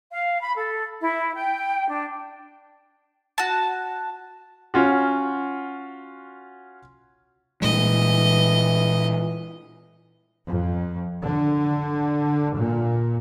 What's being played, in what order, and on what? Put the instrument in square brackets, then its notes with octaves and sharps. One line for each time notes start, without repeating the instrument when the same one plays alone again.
[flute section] F5
B5
A4
E4
G5
D4
[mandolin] F#4 A5
[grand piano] C#4 F4 F#4
[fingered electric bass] A#2 G3 G#3 [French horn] E3 [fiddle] D#5
[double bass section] F2
D3
A#2